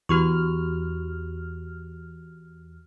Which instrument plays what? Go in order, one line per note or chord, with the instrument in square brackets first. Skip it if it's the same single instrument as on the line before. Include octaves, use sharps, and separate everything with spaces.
[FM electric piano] E2 F6 [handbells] F#4 G4 C#6